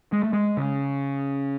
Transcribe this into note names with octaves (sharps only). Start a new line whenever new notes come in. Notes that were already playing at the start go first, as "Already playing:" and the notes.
G#3
A3
G#3
C#3